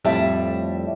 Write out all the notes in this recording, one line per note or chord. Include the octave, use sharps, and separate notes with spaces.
F2 A2 G3 E5 A5